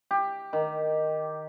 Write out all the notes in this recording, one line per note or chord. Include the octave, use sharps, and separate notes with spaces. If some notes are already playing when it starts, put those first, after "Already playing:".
G4
D#3